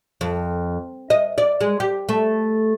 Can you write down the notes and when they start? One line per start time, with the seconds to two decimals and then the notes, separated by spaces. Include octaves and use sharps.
0.21 F2
1.10 D#5
1.38 D5
1.61 G#3
1.80 G4
2.09 A3